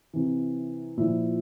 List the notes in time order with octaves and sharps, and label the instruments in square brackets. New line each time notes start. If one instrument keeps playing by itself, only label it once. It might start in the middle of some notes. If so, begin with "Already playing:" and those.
[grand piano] C3 E3
A#2 F3 E4